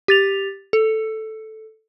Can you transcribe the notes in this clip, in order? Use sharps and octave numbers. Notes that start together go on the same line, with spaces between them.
G4 A6 F7
A4